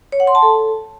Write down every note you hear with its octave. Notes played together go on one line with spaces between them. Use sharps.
C#5
F#5
C6
A5
A4